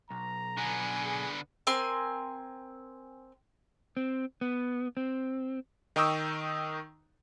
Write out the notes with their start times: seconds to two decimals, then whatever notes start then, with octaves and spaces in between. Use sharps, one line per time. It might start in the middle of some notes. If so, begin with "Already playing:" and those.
0.10 B1 A#5
0.57 D3 B3 G#5
1.04 G#4
1.67 C4 A#4 G#5 C6
3.97 C4
4.41 B3
4.97 C4
5.96 D#3 D#4 G5 C#6 D#6 E6